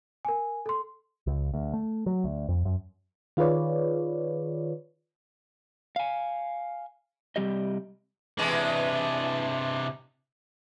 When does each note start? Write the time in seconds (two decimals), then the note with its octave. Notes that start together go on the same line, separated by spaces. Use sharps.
0.25 A#4 G#5
0.66 A4 C6
1.27 C#2
1.54 D2
1.73 A3
2.06 F#3
2.24 D2
2.48 F2
2.65 F#2
3.37 D#3 F4 G#4 B4 C#5 D5
5.96 F5 G#5
7.36 C3 G3 G4 D#5
8.39 E2 C3 E3 G#3 D4